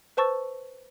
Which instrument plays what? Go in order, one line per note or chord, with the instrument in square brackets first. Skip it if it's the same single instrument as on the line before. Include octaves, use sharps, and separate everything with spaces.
[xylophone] B4 C5 A5 C#6 E6 A6